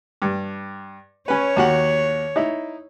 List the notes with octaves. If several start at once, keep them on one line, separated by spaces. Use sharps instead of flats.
G2
C#4 B4 C#5
D#2 F#4 F#5
D#4 E4